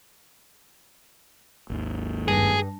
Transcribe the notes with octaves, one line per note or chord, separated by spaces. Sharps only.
G#1 D#2
G2 G#4